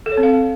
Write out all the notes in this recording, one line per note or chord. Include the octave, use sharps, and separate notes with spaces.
A4
C#5
C4
F5